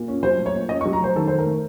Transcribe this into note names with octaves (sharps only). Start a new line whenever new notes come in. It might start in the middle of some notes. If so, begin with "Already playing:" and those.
Already playing: A#2
C#4
F#3 C5
A3
C#5
A#2
C#4 D#5
C#6
F#3
A#5
A3 C5
D#3 A4
D#3 C5
A#4
A3